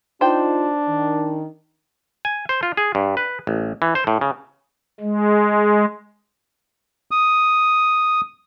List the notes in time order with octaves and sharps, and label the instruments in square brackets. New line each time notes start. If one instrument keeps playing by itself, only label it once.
[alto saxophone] D4 [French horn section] D#4 F4 [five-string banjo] C5 G5
[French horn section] D#3
[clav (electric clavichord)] G#5
C5
F4
G#4
G2
B4
A1
E3
C5
A2
C#3
[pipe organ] G#3
[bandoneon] D#6